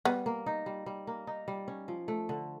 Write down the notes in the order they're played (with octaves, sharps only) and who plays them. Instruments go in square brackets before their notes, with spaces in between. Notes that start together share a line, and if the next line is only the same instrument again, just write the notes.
[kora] G3 [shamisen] B3
[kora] A#3
D#4
G3
G3
A#3
D#4
G3
C#4
F3
A3
D3